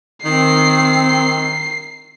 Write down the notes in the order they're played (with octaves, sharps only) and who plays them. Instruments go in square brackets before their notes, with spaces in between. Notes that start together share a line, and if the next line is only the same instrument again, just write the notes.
[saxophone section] D#3 [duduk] C4 [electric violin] C7